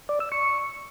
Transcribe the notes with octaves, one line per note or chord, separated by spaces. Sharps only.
D5
E6
C#6